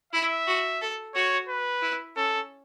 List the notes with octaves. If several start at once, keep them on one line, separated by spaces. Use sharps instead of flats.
E4 E5
F#4
A4
F#4 C#5
B4
E4
C#4 A4